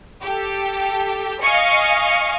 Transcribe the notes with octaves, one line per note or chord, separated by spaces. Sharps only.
G4 A4
D#5 F5 G#5 C#6 C#7